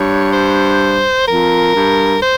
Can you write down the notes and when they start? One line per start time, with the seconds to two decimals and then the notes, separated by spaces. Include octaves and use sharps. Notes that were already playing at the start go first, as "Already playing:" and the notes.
Already playing: G2 C#5
0.33 C5
1.27 F2 A#4
1.75 G2
2.22 C5